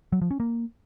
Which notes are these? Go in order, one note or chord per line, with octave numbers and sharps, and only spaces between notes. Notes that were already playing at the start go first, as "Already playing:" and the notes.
F#3
F3
C#4
A#3